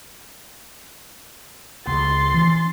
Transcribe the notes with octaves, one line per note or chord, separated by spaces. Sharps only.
C#2 C6 A6
E3 C#4